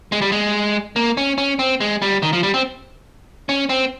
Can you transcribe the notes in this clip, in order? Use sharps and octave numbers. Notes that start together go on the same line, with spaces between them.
G#3
G3
G#3
A#3
C#4
C#4
C4
G#3
G3
D#3
F3
G3
C4
C#4
C4